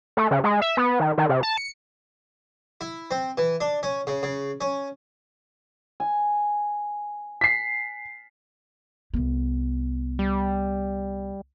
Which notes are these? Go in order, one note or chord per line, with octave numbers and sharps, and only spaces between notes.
A3
C#3
G#3
E5
B3
D#3
D#3
C3
A5
C#7
E4
C4
E3
D4
C#4
C#3
C#3
C#4
G#5
B6 C7
C2 B3
G3